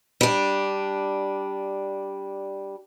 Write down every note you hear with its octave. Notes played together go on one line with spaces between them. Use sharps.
G3 D4